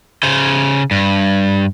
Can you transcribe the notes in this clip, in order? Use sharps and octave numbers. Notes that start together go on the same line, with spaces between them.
C#3 C5
G2